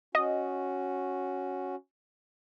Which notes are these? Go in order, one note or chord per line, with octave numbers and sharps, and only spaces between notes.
C#4 F#4 D#5